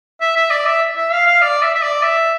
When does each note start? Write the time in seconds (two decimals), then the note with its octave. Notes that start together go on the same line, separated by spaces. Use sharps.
0.21 E5
0.36 E5
0.50 D5
0.66 E5
0.96 E5
1.12 F5
1.26 F5
1.42 D5
1.62 E5
1.75 E5
1.82 D5
2.02 E5